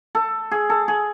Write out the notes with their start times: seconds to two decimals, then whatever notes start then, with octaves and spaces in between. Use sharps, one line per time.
0.15 A4
0.51 G#4
0.70 A4
0.88 G#4